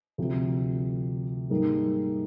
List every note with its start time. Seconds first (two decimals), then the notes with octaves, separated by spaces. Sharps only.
0.18 D2 C3 F3
1.50 G#2 G3 A#3 D#4 G#4